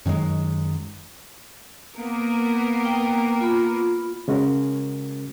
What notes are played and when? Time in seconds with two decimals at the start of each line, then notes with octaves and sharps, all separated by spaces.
0.06 F#2 D#3 F#3 G#3
1.95 A#3 B3 A#4
2.85 G5
3.41 F4 B5
4.28 C#3 G#3 C#4 F#4 A#4